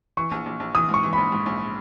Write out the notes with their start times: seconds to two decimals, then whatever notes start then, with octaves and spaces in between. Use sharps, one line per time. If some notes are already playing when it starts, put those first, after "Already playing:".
0.17 E3 C#6
0.31 A#1
0.46 A#1
0.60 A#1
0.75 E3 D#6
0.89 G#2 C#6
1.03 E3
1.13 A#1 B5
1.32 G#2
1.46 A#1